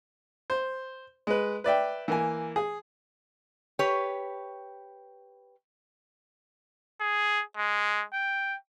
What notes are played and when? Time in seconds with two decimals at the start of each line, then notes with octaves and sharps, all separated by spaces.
0.50 C5
1.27 G#3 B4
1.64 B4 D5 E5 G5
2.08 E3 A#3 G#5
2.56 G#4
3.79 G4 B4 C#5
7.00 G#4
7.57 G#3
8.13 G5